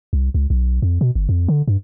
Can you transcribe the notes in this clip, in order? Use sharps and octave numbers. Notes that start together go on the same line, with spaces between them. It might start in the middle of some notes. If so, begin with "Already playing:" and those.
C2
C#2
B1
F2
B2
G1
F2
D3
G2